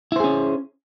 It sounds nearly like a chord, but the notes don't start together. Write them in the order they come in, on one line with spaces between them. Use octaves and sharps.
E4 C5 G#4 C#4